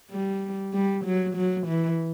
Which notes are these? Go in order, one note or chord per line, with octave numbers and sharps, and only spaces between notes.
G3
G3
F#3
F#3
E3